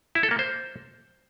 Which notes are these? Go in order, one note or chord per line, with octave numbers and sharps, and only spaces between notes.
E4
A4
A#3
C5